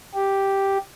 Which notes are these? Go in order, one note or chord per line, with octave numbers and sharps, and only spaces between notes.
G4